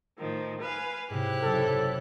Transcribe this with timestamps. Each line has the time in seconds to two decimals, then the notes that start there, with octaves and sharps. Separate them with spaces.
0.17 A2 D#3 F3
0.60 B4 F5 G#5
1.10 G#2 C3 E4 G4 F#6
1.43 F#1 A4 F6